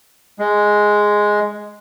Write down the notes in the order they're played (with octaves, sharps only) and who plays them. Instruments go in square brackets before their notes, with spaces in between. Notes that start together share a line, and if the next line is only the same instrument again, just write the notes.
[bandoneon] G#3